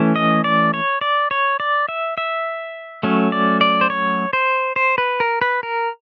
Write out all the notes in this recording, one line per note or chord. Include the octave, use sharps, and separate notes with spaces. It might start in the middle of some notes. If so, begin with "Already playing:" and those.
Already playing: E3 A3 C#4
D#5
D5
C#5
D5
C#5
D5
E5
E5
F#3 A3 C#4
D5
D5
C5
C#5
C5
C5
B4
A#4
B4
A#4